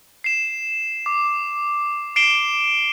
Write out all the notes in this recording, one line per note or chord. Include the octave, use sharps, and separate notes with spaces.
C7 E7
D6
C7 D7 E7 G7